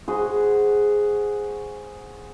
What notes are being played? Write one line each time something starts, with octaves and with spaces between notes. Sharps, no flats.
F#4 G#4 C5 F#5